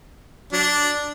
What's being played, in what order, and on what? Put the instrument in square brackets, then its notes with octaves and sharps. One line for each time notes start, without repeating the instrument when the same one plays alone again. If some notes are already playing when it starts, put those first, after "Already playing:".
[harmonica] F#3 D4